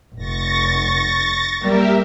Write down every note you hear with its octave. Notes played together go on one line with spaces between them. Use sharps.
F1 C#6 A6 A#6
G3 A#3 G4 A#4 E5